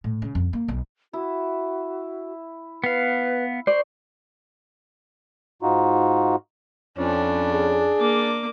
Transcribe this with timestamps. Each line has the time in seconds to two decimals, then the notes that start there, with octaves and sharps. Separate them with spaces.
0.04 A2
0.22 C#3
0.35 F2
0.53 A#3
0.68 B1
1.13 E4 F#4
2.84 B3 B4 F5
3.67 C5 D5 C#6
5.62 G#2 D#4 F4 F#4
6.98 F2 C#4 D4
7.52 G#4
7.99 A#3 D6